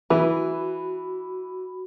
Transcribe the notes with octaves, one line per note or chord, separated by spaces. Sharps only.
E3 F#4 B4 B5